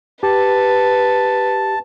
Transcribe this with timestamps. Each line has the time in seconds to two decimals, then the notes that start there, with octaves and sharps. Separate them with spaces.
0.23 G4 B4 A5